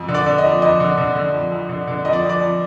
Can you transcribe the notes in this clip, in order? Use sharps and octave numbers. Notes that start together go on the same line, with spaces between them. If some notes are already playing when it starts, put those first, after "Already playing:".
Already playing: F2
D3
D5
D3
D#5
F2
F2 D#5
D3
D3
D3
F2
F2
D3
D3
F2 D#5
D5
F2
D5
F2